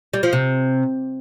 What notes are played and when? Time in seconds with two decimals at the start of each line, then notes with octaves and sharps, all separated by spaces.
0.13 G3
0.23 F3
0.33 C3